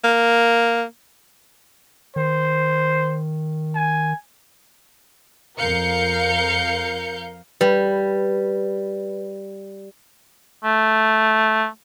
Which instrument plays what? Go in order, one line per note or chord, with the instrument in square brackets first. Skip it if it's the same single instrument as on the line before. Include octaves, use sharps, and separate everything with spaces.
[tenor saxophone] A#3
[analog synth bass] D#3 [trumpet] C5
[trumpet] G#5
[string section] F2 A#4 F5 G6 C#7
[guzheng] G3 [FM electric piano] B4
[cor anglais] A3